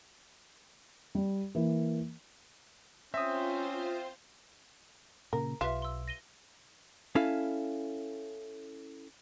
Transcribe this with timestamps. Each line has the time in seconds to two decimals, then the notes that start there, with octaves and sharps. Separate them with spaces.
1.15 G3
1.55 E3 A#3
3.14 C4 C#4 F4 C5 E5 D#6
5.33 A#2 C#3 A#4
5.61 B1 F4 G4 B4 E5
5.82 C6 E6
6.08 A#6 D#7 G7
7.15 C#4 E4 A4 F5